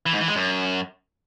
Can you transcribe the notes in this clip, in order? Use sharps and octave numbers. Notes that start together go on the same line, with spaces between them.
E3
G#2
E3
G#3
F#2